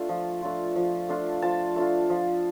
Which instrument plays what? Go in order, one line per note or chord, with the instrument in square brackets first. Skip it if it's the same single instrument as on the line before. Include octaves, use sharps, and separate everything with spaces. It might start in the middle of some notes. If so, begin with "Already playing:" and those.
Already playing: [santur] A3 D4 F4
F3
A3 D4 F4
F3
A3 D4 F4
F3 A5
A3 D4 F4
F3